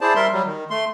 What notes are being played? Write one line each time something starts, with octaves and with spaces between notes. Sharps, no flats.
E4 G#4 C5 D5 A5
G3 A#4 E5 C6
F#3 G3
D#3
A3 C6